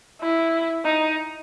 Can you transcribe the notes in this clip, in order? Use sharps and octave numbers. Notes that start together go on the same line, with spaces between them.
E4
D#4